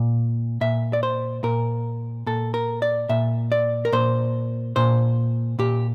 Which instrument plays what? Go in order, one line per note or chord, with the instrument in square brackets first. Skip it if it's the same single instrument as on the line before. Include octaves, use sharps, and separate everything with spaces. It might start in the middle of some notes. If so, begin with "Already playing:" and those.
Already playing: [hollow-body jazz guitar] A#2
A#2 E5
D5
C5
A#2 A#4
A#2 A4
A#4
D5
A#2 E5
D5
A#4
A#2 C5
A#2 C5
A#2 G4